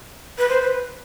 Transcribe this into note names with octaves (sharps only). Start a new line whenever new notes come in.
B4
C5
B4